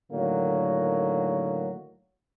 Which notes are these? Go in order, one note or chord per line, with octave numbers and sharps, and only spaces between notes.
A2 D3 D#3 F#3 A#3